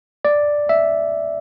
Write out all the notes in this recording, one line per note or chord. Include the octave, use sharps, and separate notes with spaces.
D5
E5